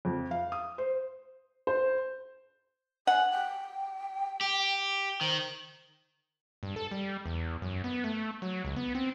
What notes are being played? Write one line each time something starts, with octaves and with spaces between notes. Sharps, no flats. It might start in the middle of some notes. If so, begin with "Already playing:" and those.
F2
F5
D#6
C5
C5
F#5 G#5
G5
G4
D#3 C5
G2
A4
G3
E2
F#2
B3
A3
F#3
C#2
B3
C4